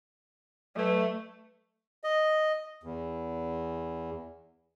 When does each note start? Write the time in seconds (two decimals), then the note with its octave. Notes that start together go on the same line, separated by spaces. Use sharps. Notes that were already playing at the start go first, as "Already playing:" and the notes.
0.76 F#3 A3 B4
2.04 D#5
2.84 E2